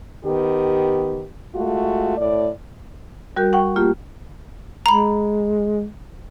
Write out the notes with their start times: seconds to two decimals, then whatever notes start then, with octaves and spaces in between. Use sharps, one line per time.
0.24 D#3 B3 G4
1.54 G#3 A3 F4 F#4
2.17 A2 D5
3.36 G3 F#4 A#4 G6
3.53 F#5 G5 C#6
3.76 A3 A#3 F4 G4
4.86 G#3 A#5 B5